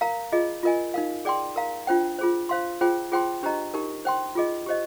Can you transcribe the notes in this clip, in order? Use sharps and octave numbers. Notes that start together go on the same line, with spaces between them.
A#4 F5 A#5
F4 G#4 D#5
F4 A#4 D#5 G#5
D#4 A#4 F5
G#4 D5 G5 C6
A#4 F5 A#5
D4 F4 C5 G5
F4 G#4 C5
C5 F5 C6
F4 G#4 C5 G5
F4 G#4 C5 G5 C6
D4 G4 C5 D#5 A#5
D#4 G4 A#4
C5 G5 C6
F4 G#4 D#5
G4 C5 D#5